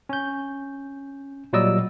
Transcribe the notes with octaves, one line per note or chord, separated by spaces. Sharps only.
C#4 G6
A#2 F#3 G3 D5 D#5 E6